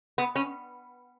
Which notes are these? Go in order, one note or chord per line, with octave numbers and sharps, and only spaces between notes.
B3
C#4